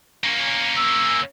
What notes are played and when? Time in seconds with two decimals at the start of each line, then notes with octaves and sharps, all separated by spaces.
0.24 A#3 C#4
0.76 E6